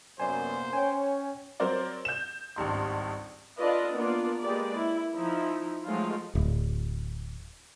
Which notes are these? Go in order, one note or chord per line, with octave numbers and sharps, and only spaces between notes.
F#2 C3 A#3 B3 C5 D5 G#5
C#4 C#5 G5 G#5
F#3 C4 A#4 C5 D5
G6 E7
G#1 C#2 G2 C6
D4 F4 A4 B4 D5 D#5
A#3 B3 D4 F4 D5
G#3 A#3 G4 B4 D5
E4
F3 D#4 E4
F3 F#3 G#3 A3 F4
D1